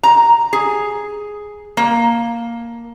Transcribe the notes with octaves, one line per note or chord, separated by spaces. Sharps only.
A#5
G#4
A#3